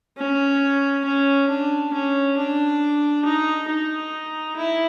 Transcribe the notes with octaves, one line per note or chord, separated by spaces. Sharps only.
C#4
C#4
D4
C#4
D4
D#4
D#4
E4